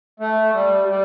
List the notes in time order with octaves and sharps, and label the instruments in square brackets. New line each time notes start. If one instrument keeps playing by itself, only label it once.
[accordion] A3
G3
G3